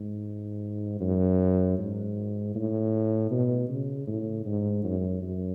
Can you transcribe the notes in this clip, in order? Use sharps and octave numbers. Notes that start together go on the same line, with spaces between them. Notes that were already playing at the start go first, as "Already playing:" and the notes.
Already playing: G#2
F#2
G#2
A2
B2
C#3
A2
G#2
F#2
F#2